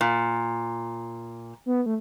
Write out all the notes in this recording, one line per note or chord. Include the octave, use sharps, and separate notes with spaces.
A#2
B3
A3